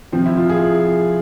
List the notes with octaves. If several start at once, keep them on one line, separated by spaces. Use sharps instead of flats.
C3 F3 C4
E4
F4
G#4